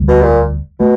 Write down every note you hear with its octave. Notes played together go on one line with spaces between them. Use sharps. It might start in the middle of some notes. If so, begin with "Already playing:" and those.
Already playing: E1 D2 D3 G3
B2
A#2
B2 A3